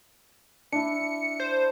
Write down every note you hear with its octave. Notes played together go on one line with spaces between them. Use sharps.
D4 E4 C#7
C5